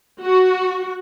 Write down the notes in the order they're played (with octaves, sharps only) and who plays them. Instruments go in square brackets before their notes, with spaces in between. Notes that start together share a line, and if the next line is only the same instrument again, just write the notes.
[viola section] F#4